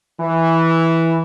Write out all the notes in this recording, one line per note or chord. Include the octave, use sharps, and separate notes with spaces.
E3